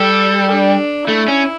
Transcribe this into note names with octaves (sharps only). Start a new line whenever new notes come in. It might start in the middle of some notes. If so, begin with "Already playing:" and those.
Already playing: G3 A4
D4
A3 E4
C#4